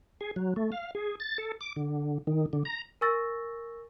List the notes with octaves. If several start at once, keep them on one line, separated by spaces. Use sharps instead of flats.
G#4
F#3
A3
F5
G#4
A6
A4
D6
D3
D#3
D3
A#5
A#4 G#5 C#6 E6 A6 A#6